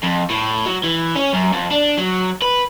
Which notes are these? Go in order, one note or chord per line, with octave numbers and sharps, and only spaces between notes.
F2
A2
F#3
E3
C#4
F#2
F2
D4
F#3
B4